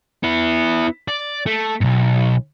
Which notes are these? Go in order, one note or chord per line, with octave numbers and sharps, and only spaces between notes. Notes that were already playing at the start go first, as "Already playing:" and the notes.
B3 E4
D5
A3
B1 G#2